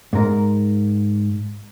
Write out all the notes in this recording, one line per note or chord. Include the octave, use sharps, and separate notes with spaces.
G#2 A#4